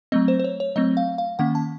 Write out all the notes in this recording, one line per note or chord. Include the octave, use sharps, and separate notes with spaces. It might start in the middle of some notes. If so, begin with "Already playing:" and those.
F#3 A3 C4 D#5
C5
C5
C#5
C#5
F#3 A3 C4 D#5
F5
F5
D#3 A#3 C#4 F#5
A5